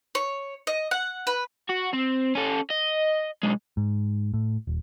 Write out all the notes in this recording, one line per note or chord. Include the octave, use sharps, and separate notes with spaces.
C#5
D#5
F#5
B4
F#4
C4
C#4 A4
D#5
B1 G#3
G#2
A2
D#1